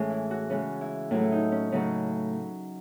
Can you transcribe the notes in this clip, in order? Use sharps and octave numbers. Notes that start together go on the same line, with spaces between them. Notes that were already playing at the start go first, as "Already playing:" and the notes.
Already playing: A2 E3 G#3 C#4
E4
F#4
C#3 G#3 C#4
E4
A2 F#3 A3 E4
D#4
C#4
C#3 F#3 A3 C#4